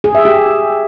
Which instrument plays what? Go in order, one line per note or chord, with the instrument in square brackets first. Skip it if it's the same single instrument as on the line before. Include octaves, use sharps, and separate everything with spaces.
[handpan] G#4
E5
G4